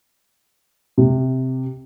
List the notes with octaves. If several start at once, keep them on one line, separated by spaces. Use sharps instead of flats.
C3